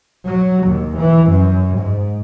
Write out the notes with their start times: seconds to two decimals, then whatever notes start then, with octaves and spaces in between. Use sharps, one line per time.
0.25 F#3
0.65 D#2
0.97 E3
1.28 F#2
1.76 G#2